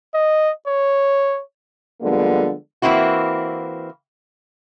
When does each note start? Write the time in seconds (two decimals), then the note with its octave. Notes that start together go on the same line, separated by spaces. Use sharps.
0.14 D#5
0.67 C#5
2.01 D3 F3 G3 G#3 A#3 B3
2.82 E3 A#3 C4 E4 F#4